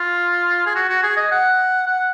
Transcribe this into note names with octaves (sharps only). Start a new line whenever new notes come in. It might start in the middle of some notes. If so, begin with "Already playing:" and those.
Already playing: F4
G#4
F#4
F#4
G#4
D#5
F#5
F#5